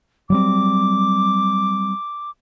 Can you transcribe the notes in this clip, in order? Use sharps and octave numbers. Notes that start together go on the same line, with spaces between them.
F#3 G3 C4 D6